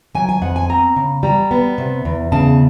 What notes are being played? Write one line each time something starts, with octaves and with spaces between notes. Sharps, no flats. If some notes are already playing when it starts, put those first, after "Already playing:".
F#3 G#5
G#5
F2 F#5
G#5
C4 A#5
C#3
G3 A#5
B3
C3
E2
C#3 A5